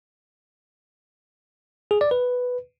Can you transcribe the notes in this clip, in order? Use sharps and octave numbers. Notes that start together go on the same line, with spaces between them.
G#4
D5
B4